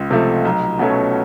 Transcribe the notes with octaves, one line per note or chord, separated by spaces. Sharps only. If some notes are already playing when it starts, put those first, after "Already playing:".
Already playing: C#2
C3 F3 A3
B1
B2 F#3 A3 C#4